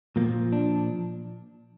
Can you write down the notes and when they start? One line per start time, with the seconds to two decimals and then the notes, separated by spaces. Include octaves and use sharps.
0.16 A#2 F3 A#3
0.52 D4